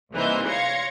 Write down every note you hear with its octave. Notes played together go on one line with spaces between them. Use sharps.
C2 E3 A#3 D#4 C5 G6
C#5 F5 C6 G#6 A#6 C#7